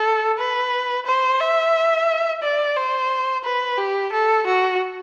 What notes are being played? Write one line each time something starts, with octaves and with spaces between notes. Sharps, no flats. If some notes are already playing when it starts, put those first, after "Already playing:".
Already playing: A4
B4
C5
E5
D5
C5
B4
G4
A4
F#4